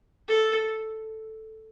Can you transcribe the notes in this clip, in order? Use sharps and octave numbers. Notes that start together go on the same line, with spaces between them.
A4